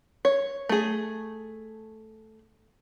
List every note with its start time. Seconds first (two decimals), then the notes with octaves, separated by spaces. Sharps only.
0.25 C#5
0.69 A3 G#4